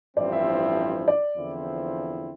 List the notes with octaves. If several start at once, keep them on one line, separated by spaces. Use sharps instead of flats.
A1 G2 F3 C4 E4 D5
E5
D5
E2 D3 F3 C4 E4